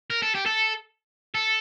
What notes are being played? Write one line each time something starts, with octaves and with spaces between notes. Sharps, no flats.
A#4
A4
G4
A4
A4